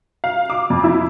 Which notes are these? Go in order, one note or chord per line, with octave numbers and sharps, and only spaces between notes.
F5
D6
F2
E4